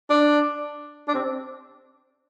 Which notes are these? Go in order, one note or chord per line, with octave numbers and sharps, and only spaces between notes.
D4
D4
C4